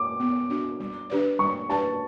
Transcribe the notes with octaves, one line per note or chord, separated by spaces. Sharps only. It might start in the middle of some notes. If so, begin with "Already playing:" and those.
Already playing: D6
B3
D4 F#4
G3
D4 G4 B4 D5
G3 C#6
D4 G4 B4 D5 A5